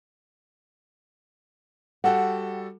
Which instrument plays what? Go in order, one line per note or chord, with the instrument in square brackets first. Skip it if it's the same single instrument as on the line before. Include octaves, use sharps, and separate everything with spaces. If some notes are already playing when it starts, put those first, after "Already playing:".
[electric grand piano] G3 F#4 A4 [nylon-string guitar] F#5 G5